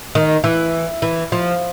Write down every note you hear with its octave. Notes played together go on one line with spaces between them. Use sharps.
D#3
E3
E3
F3